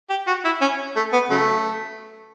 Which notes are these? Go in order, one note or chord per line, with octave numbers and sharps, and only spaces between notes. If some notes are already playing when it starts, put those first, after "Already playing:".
G4
F#4
E4
C#4
A3
B3
C#3 F#3 A3